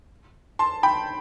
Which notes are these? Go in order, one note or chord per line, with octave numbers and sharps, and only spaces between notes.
A5 C6
G5 B5